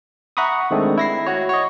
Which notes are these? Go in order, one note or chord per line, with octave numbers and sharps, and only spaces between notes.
E5 F#5 A#5 B5 C#6 D#6
D#3 G#3 A3 C4 D4
E4 A#6 C7
F#4 C#5
C#5 D#5